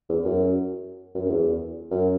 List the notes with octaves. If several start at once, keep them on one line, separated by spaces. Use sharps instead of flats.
E2
F#2
F#2
F#2
E2
F#2